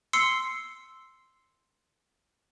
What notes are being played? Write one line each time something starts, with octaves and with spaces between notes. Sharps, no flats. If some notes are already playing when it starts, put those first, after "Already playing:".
C6 E6 C7 C#7